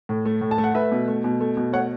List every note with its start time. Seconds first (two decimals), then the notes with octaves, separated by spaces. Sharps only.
0.09 A2
0.25 A3
0.41 A2
0.51 A5
0.58 A3
0.64 F#5
0.74 A3 B4 E5
0.92 B2
1.08 A3
1.24 B2
1.40 A3
1.57 B2
1.73 A3 C#5 F#5